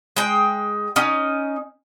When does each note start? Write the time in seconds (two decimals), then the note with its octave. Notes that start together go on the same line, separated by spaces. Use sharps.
0.16 G#3 G5
0.96 C#4 D#4